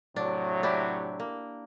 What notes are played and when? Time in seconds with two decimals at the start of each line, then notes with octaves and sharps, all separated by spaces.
0.16 A2 C3 F#3 D4
0.63 D4 E4 G4
1.20 A#3